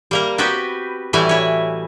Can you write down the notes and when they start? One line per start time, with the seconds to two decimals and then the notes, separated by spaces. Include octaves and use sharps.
0.11 G3 A#3 A#4
0.38 B3 C4 F#4 G4 B4
1.13 A2 E3 G3 E4 F#4 G#5
1.29 E4 C#5